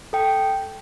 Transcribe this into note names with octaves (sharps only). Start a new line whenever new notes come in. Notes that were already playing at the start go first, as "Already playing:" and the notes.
A4 G5